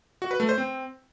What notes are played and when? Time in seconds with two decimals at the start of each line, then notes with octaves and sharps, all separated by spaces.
0.22 F#4
0.31 B4
0.40 A3
0.49 C5
0.58 C4